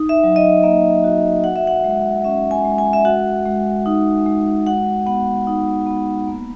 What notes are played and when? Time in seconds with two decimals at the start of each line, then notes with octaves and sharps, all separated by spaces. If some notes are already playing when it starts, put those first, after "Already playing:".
Already playing: D#4
0.09 E5
0.23 F#3
0.36 D#5
0.63 A#3 E5
1.04 F#4
1.44 F#4 F#5
1.56 E5
1.67 F#5
1.84 G#3
2.24 C#4 E5
2.51 G#5
2.65 G#3
2.78 G#5
2.93 E5
3.05 F#4 F#5
3.45 G#3
3.86 D#4
4.26 G#3
4.66 F#4 F#5
5.06 B3 F#5
5.47 D#4
5.87 B3
6.27 A#3